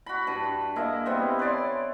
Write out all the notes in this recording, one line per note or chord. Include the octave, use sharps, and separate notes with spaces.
F#4 B5
G2
A#3 E4 G#4 D#5
C3 G3 B3 C4
B4 C#5 D5 C6